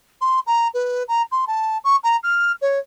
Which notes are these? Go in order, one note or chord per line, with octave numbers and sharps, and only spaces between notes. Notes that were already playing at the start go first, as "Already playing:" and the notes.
C6
A#5
B4
A#5
C6
A5
C#6
A#5
F6
C#5